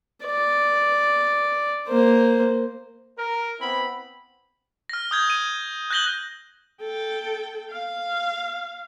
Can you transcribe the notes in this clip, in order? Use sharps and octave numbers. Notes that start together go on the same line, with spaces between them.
D5
A#3 C5
A#4
B3 C4 E4 B5
F6 A#6
D#6 G6 G#6
D#7
F#6 G6 A#6 F#7 G7
A4 G5
F5